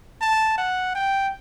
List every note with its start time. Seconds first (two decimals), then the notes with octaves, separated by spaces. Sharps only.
0.21 A5
0.57 F#5
0.95 G5